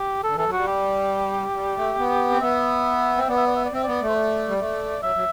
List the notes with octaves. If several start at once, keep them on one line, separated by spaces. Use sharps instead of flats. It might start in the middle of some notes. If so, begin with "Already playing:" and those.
Already playing: G4
D3 A4
E3 A4
F#3
G3 F#4
G4
G3
A3
B3
C4
B3 E5
C4
B3 D5
E5
D5
E5
D5
C4 E5
B3 D5
A3
C5
D5
G3
A3
F#3 E5
F#3